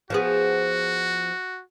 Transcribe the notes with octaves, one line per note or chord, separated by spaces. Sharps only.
F3 B3 F#4 G#4